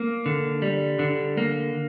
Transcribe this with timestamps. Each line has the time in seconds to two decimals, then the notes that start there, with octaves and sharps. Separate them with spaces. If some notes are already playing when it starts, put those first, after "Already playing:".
Already playing: A#3
0.26 D3
0.62 G3
0.99 D3
1.37 A#3